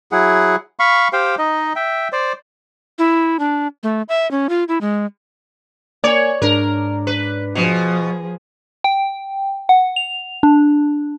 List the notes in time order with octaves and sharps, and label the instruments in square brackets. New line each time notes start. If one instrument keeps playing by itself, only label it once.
[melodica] F#3 E4 G#4 F#5
F5 B5 C#6
G4 C5 F5 G5
D#4 D#5
E5 G5
C5 D5
[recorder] E4
D4
A3
E5
C#4
F4
E4
G#3
[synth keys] A#3 G#5 [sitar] C#5 [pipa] D5
[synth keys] G#2 D4 [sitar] A#4
[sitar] B4
[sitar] B2 [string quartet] F3 G#4
[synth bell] G5
F#5
F7
D4